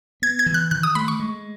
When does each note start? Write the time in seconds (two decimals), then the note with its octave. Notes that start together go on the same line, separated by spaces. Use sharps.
0.22 B3 G#6
0.39 G#6
0.46 E3
0.54 F#6
0.71 D#3 F#6
0.83 D#6
0.95 A3 B5
1.08 C#6
1.20 G#3